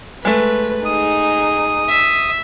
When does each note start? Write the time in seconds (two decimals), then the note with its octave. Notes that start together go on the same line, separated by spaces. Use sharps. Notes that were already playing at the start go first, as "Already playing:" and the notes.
0.25 G#3 A3 B4
0.85 D#4 G#4 D#6
1.89 E5